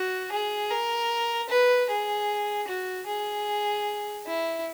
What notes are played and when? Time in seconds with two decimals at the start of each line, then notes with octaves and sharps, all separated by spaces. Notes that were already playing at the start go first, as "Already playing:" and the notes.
Already playing: F#4
0.32 G#4
0.71 A#4
1.49 B4
1.89 G#4
2.68 F#4
3.07 G#4
4.26 E4